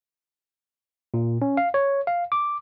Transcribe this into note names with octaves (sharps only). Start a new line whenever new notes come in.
A#2
C#4
F5
C#5
F5
D6